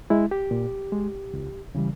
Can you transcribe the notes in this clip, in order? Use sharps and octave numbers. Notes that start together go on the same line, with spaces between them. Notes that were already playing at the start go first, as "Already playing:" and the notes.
G#3 E4
G4
A#2
G#3
C#2
C#3 E3 G3